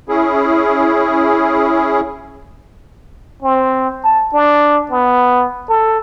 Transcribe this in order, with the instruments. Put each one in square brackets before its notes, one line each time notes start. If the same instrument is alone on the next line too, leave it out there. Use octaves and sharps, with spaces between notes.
[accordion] C#4 E4 G#4
[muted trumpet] C4
A5
D4
B3
A4